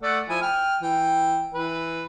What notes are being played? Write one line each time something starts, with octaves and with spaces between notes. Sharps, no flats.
A3 D5 F#5
F3 E4 G#5
G5 F6
E3 G5
E3 B4